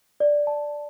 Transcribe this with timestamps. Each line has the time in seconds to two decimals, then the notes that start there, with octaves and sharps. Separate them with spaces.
0.20 D5
0.47 A5